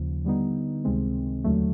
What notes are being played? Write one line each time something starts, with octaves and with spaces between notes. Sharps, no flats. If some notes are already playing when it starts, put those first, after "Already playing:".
Already playing: D#2 C#3 F3
D3 G3 B3 D#4
C#2 C3 D#3 G#3 C4
D#2 D3 F#3 A3